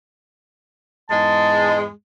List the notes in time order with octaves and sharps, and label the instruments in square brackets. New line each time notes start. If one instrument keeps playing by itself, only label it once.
[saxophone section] E2 G#2 G#3 [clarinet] A5